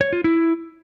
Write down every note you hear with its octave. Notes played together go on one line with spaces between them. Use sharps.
C#5
F4
E4